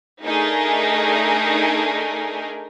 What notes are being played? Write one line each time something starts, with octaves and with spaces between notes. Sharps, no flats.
A3 D4 D#4 G#4 A#4